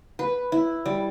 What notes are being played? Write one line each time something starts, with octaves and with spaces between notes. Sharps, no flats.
B4
E4
G3